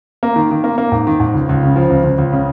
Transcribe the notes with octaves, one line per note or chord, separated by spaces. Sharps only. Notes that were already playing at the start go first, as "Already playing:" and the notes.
A#3
D#3
D#3
A#3
A#3
G#2
D#3
G#2
C#2
C#2
C#3
F3
C#2
C#2
C#2
C#3